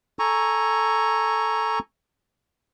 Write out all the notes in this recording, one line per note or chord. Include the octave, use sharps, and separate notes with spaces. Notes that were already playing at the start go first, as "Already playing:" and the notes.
A4 G#5 A#5 C#6